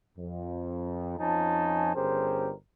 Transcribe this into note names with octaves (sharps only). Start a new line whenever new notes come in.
F2
F2 F3 C#4 D#4 G#5 A5
G1 C#4 G4 G#4 A#4 C5